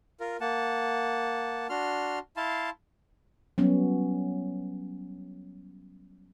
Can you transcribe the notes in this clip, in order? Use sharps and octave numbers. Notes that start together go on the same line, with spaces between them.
F4 A#4
A#3 F#5 A5
D4 F#4 C6 F6
E4 F5 A5 C6
F#3 G3 B3 C#4